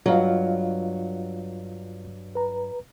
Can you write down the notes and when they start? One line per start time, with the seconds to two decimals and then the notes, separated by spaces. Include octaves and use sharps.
0.06 G2 F#3 F4 D#5 F5
2.35 B4 A#5